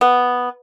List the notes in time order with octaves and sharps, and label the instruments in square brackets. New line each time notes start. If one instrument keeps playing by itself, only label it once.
[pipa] B3